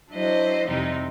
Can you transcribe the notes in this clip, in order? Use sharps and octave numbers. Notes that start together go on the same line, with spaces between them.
F#3 D4 E4 C5 D#5
F2 C3 E3 G3 C4 D#4